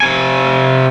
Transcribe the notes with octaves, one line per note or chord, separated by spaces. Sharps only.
C3 G#5